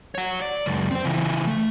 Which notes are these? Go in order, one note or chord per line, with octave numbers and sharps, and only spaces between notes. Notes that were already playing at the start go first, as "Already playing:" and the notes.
C#5 F#5
D5
C#2 F#2
C4 C5
C#3 E3
A3